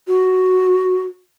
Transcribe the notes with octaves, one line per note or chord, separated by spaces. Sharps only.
F#4